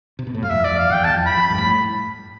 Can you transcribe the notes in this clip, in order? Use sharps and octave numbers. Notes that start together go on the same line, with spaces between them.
C3
B2
A2
G2 F5
F2 E5
D5
F2
F5
F2
E2 G5
A5
F2
B5
F2
G2
A2